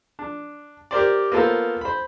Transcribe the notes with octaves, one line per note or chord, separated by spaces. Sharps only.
D4
G4 A#4 C5 D5
A#3 B3 F4 A4 C5
C5 B5